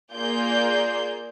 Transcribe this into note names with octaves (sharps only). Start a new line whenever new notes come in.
A#3 F4 G#4 D5 G6